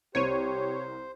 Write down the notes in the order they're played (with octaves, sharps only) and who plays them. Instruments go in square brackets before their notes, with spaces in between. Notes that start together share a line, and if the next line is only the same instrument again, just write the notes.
[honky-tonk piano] C2 C4 D#7 [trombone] G4 [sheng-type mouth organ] C5 [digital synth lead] C#5